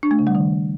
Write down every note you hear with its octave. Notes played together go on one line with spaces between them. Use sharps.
D4
A3
C#3
G3
D#3